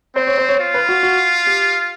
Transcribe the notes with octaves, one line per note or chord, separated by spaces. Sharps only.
C4 C5
C#5
C5
C#5
F4
B4
F#4
F#4
G4